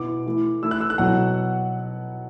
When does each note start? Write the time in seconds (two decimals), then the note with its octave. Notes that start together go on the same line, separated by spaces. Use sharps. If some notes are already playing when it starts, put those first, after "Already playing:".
Already playing: B2 B3 E4 D6
0.26 E3 A3 E4
0.63 E3 A3 E4 E6
0.71 F#6
0.81 E6
0.90 F#6
0.98 B2 F#3 B3 E4 F#5